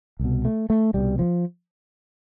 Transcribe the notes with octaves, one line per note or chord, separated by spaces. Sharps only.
C2 B2
A3
A3
C2 B2 G3
F3